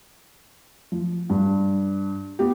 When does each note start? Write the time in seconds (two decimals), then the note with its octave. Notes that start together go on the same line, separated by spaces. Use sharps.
0.92 F3
1.29 G2
2.39 B3 G4